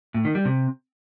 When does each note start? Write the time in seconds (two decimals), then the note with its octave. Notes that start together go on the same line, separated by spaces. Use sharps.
0.14 A2
0.25 D#3
0.35 G3
0.45 C3